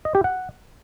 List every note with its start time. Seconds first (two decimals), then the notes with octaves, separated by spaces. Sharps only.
0.05 D#5
0.15 G4
0.24 F#5